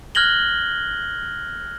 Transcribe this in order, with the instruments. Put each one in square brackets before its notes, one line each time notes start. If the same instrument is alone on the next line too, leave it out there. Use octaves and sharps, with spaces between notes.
[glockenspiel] F6 F#6 G#6 A#6 F#7 G7